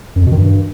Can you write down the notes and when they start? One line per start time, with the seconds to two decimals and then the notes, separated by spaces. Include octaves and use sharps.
0.16 F#2
0.21 F2
0.27 B2
0.32 D#3
0.37 G2